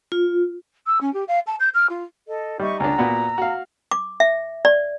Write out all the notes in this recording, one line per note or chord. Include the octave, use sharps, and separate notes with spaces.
F4
E6
C#4
G4
F5
A5
G6
F6
F4
A4 D#5
G3 D#4 E5 C#6
C#2 D4 A#5 E6
A#2 B3 F#4
F#4 F5
D6
E5
D5